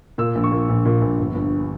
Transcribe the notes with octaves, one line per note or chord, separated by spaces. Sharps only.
A#2 E6
A#1
C#6
A#2
A#1
A#2
A#1
G1
G1